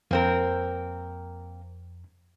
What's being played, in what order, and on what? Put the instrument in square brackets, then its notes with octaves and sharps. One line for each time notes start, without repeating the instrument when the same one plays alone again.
[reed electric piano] F2 [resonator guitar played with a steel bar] A#3 C4 A#4